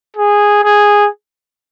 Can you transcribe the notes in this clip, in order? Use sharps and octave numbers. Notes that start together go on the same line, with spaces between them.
G#4
G#4